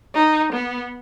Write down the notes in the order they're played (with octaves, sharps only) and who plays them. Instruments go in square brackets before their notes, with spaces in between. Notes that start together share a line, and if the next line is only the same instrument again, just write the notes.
[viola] D#4
B3